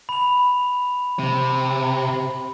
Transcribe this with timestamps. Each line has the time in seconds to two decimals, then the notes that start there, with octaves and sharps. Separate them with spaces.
0.09 B5 F7
1.19 C3 B5